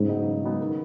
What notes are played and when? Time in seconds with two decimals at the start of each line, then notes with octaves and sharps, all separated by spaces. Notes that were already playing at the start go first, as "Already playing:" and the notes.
Already playing: G#2 C#3
0.09 F#3 B3 D#4
0.27 C#3
0.44 F#3 B3 D#4
0.61 D#3